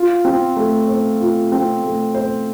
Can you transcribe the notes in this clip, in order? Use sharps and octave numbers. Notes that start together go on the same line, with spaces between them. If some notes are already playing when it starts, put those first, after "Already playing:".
Already playing: F4
C4
A3
C5
F4
C4
A3
C5